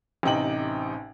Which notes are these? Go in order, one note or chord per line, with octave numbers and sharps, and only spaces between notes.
A1 C3 D#4 G5 F#7